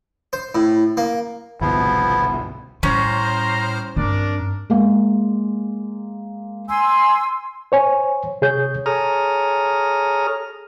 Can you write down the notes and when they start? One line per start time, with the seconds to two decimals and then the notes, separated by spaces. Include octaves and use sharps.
0.33 C5
0.55 A2
0.97 A#3
1.61 G1 C2 B2 F3 B3 E4
2.83 A2 G3 C#4 C5 A#5 C6 F6
3.96 G2 C4 D4 A#4 D5
4.70 G#3 A#3
6.69 G#5 C6 E6
7.72 C5 C#5 G#5
8.42 C3 G#4 C#5 G6
8.86 G#4 A4 C#5 A#5 D#6 F6